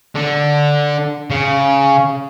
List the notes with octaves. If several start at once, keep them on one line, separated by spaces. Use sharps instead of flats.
D3
C#3